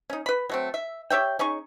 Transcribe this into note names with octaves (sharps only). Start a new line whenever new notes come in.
C#4 D#4
B4 B5
F#3 A3 C4
E5
G4 C#5 E5 G5
C#4 D#4 G#4 C#6